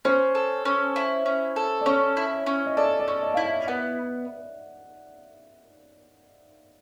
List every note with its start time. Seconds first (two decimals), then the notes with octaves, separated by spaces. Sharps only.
0.05 C#4 C5
0.35 A4
0.65 C#4
0.96 E4
1.26 C#4
1.56 A4
1.81 D5
1.86 C#4 C#5
2.17 E4
2.46 C#4
2.66 D#5
2.77 A4 D5
2.99 D5
3.08 C#4
3.22 D#5
3.34 E4 F5
3.45 E5
3.67 B3 F#5